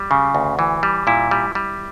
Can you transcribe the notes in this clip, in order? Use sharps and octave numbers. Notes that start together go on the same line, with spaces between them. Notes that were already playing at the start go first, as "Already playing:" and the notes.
Already playing: G3
C#3
D2
E3
G3
A#2 E4
G3
G3